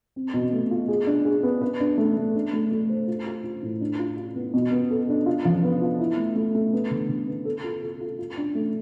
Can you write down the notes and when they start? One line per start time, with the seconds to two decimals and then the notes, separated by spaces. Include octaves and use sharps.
0.16 C4
0.34 B2
0.53 A3
0.71 F4
0.88 G#4
1.07 D4
1.25 G#4
1.43 B3
1.62 B4
1.80 D4
1.98 A3
2.17 A3
2.35 D4
2.53 A3
2.72 A3
2.89 C5
3.08 F4
3.26 F4
3.44 F4
3.63 A2
3.81 D4
3.99 F4
4.17 F4
4.36 B3
4.54 B2
4.72 B3
4.91 A4
5.09 D4
5.26 F4
5.45 F3
5.64 B3
5.81 F4
5.99 E4
6.17 A3
6.36 A3
6.55 A3
6.73 B3
6.91 D3
7.09 D3
7.28 B3
7.45 A4
7.64 F4
7.83 A4
8.01 F4
8.19 F4
8.37 D4
8.55 A3